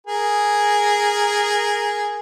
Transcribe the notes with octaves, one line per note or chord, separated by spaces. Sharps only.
G#4 A#4